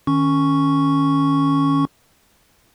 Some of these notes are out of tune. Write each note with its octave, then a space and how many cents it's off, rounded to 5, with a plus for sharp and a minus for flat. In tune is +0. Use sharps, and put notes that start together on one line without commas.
D#3 +0 C#4 +0 C#6 +0